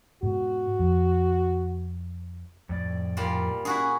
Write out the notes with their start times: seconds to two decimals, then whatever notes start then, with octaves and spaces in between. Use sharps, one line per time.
0.23 G#2 B2 F#4
0.79 F2
2.69 F2 A2 D5
3.17 A#2 G3 F4
3.65 C#4 E4 F#4 G#4